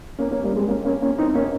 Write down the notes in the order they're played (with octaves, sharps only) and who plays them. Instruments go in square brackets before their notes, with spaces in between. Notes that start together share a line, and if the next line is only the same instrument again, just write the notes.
[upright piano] A#3 C#4
A#3 C#4
G3 A#3
G#3 C4
A#3 C#4
A#3 C#4
A#3 C#4
C4 D#4
A#3 C#4